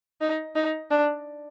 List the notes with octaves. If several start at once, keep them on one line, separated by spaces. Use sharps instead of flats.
D#4
D#4
D4